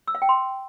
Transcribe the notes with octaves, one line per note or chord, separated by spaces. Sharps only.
E6
F5
G5
C6